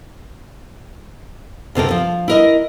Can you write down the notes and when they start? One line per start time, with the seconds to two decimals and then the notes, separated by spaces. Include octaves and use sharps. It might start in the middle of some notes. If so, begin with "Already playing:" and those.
1.75 D2 C3 A4 A#4
1.91 F3
2.28 E4 A#4 D#5